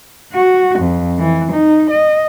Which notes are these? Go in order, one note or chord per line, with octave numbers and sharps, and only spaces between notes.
F#4
F2
E3
D#4
D#5